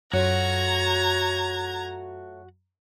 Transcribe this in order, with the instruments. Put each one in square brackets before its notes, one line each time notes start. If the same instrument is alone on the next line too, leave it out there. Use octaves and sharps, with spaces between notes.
[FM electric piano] F#2 [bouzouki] F#3 A3 F4 [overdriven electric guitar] F#4 [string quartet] A#5 G#6